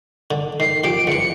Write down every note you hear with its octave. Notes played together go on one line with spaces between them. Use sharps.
D3
D#3 C7
F3 G4 D7
C#2 E3 C#7